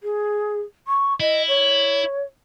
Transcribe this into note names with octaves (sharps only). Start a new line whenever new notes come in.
G#4
C#6
E4 D#5
C#5